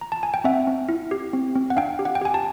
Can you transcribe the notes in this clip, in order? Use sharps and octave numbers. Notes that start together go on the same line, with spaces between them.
A#5
A5
G#5
G5
C4 E5 F#5
C4
E4
G4
C4
C4
F#5
D4 F5 G5
G4
F#5
G5
G4 G#5
A5